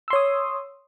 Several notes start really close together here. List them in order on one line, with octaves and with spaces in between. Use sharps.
E6 C6 C#5 D#6